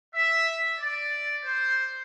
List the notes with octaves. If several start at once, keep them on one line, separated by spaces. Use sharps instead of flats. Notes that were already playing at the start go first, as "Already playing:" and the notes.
E5
D5
C5